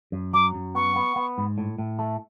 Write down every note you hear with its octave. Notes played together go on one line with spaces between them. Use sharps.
F#2
F#3 D6
F#2
B3 C#6
B3
B3
G#2
A2
A2
A3